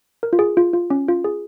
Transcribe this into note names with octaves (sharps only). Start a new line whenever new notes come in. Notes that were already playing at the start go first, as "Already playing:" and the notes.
A#4
F4
G#4
F4
F4
C#4
F4
G#4